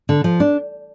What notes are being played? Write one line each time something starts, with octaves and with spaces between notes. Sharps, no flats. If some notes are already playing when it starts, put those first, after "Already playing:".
D3
F3
D4